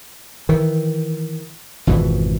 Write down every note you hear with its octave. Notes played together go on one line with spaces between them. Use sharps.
D#3 E3
G#1 F2 B2 E3